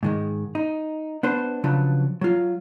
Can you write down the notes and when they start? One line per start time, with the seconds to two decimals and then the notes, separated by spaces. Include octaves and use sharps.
0.03 G#2 D#3 G#3
0.55 D#4
1.23 B3 D4 B4 C5
1.64 C#3 F3 F#3 D4 B4
2.21 F#3 F4